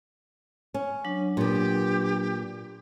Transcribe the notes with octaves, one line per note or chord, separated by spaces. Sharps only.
C#4
F#3 D4
A#2 B3 G4